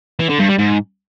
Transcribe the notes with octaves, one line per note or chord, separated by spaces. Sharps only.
E3
D3
G2
G3
G#2